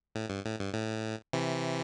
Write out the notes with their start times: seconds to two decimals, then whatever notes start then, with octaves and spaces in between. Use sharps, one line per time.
0.15 A2
0.30 G2
0.45 A2
0.60 G2
0.73 A2
1.33 C3 E3